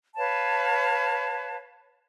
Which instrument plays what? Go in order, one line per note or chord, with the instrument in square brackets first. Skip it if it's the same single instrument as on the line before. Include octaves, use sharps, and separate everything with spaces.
[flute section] B4 C#5 F5 A5